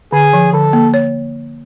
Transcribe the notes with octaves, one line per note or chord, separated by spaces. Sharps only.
D3 G#4
F3
D3 A4
A#3
C#5